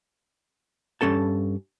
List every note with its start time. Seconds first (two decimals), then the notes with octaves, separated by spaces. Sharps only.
1.01 G2 C#4 A4 A5